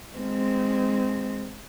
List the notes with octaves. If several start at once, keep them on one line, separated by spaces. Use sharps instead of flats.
G#3 C4